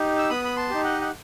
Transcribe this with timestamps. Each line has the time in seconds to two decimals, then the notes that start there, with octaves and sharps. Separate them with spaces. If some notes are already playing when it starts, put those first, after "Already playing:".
Already playing: D#4 G4
0.18 E6
0.30 B3 B5 D#6
0.45 B5
0.56 A5 C6
0.70 D#4 G4
0.84 D#5 F#5
1.01 F#5